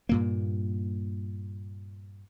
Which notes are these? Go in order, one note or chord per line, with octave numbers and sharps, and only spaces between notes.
G2 A#2 A#3